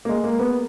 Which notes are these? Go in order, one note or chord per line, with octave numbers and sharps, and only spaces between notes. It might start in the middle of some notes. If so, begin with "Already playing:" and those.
A#3
G#3
A#3
B3